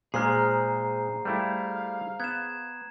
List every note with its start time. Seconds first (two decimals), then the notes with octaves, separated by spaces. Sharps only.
0.14 A#2 G#3 G#4 C5 A#5 F6 C7
1.25 G3 A3 E4 F5
2.20 B3 G#6 E7